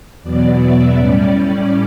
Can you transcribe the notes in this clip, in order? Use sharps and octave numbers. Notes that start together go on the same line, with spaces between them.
E2 B2 F#3 B3 D5
E5
A2 G3 C#4 D5